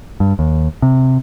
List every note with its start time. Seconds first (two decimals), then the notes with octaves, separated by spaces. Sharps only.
0.20 G2
0.39 D#2
0.82 C3